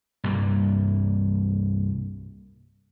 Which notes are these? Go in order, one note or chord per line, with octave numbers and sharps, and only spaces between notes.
C2 G2 G3 A#3